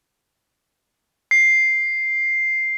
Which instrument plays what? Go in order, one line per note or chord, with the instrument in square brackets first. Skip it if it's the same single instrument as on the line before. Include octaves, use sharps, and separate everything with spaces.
[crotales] C7